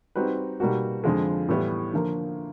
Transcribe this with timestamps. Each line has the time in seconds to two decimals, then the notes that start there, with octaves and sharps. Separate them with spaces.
0.15 G3 C4 D#4 F#4 B4
0.60 B2 G3 A#3 D#4 F#4
1.04 F2 D3 F3 G#3
1.49 A2 E3 G3 B3 E4
1.94 D3 F3 A#3